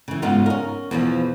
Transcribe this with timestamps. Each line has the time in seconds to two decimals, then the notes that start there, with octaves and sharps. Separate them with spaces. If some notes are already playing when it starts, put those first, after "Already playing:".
0.08 C#3 E3
0.22 G#2 C#3 B3 D#4 F4
0.46 C#4 A#4
0.91 E2 B2 F3